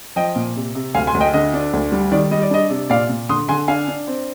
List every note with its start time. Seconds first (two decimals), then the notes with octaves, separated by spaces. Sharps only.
0.16 F3 D#5 G5
0.36 A#2
0.56 C3
0.75 C3
0.95 D2 F5 G#5
1.07 G#5 C6
1.14 D2
1.20 D#5 G5
1.34 D3 D#5
1.54 D4
1.73 D2
1.92 G3
2.12 D#3 D5
2.31 G3 D#5
2.42 D5
2.51 D4 D#5
2.70 C3
2.90 A#2 D5 F5
3.09 A#2
3.29 D3 C6 D#6
3.48 D3 G#5 C6
3.68 D4 F5 G#5
3.88 D4
4.07 C4